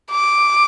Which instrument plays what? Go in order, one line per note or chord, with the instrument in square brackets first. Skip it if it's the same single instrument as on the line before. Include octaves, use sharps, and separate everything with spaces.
[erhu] D6